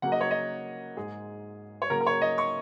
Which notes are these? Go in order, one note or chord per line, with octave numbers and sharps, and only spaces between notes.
C#3 F#3 A#3 F#5
D#5
C#5
D#5
G#2 G#3 G#4
C#5
C#3 F#3 A#3 A#4
A#4
C#5
D#5
C#6